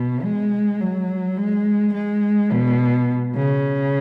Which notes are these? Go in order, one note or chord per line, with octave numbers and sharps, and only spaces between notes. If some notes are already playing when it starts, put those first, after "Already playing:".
Already playing: B2
G#3
F#3
G#3
G#3
B2
C#3